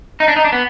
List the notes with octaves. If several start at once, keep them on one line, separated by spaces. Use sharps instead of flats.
D#4
D4
D#4
D4
B3